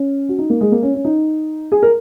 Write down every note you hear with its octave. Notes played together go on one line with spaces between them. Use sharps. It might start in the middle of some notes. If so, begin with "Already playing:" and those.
Already playing: C#4
F#4
D#4
A#3
G#3
A#3
C#4
C#4
D#4
G#4
A#4